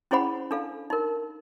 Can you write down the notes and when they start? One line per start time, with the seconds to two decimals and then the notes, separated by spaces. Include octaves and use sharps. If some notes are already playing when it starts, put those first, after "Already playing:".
0.11 C#4 E4 G#4 C5 F#5 B5
0.51 D4 A4 F5
0.90 D#4 A#4